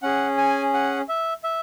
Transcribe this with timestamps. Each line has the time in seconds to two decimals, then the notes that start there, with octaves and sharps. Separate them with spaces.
0.02 C#4 G#4 F#5
0.38 G#5
0.74 F#5
1.09 E5
1.44 E5